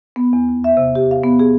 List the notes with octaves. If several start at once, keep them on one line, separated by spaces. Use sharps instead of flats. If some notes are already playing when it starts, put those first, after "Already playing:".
B3
E2
D#2
E5
C3
G4
F5
B3
G#4